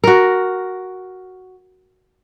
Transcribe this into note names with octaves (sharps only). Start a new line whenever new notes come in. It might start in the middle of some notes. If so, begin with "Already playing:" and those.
F#4 A#4